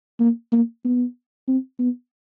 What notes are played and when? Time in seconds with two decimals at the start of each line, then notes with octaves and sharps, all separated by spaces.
0.20 A#3
0.52 A#3
0.85 B3
1.48 C4
1.79 B3